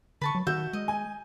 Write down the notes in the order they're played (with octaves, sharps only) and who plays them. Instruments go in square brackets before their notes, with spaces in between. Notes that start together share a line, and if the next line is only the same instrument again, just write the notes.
[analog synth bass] D3 [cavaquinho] B4 A5 C#6
[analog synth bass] F#3
[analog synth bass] D#3 [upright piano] F#4 G6 [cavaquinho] E5
[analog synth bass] G#3 [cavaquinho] D#5
[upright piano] G#5